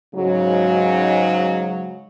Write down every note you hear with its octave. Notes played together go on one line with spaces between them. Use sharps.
G#2 C#3 F#3